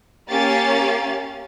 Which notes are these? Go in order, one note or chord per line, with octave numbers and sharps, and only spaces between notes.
A#3 C#4 G4 F5 A6